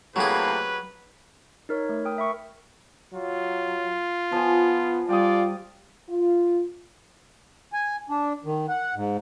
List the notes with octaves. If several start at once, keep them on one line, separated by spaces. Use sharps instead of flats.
A2 C3 F#3 A#3 G#4 B4
D#4 A#4 C#5
A3
A#4 G5 D#6
E5 B5 C#6
F#3 F4
F3 B3 G#5
G3 F4 D5 G5 D#6
F4
G#5
D4
D#3
F#5
G#2